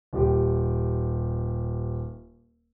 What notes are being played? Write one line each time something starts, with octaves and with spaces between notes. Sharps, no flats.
D#1 G4